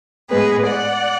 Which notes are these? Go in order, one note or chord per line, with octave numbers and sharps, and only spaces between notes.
A2 G#3 B3 G#4 B4
D5 F#5